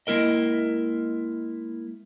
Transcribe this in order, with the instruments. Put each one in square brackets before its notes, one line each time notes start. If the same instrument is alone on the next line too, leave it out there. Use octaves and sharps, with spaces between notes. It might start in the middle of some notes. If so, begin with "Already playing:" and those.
[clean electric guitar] G#3 A#3 E4 A#4 D#5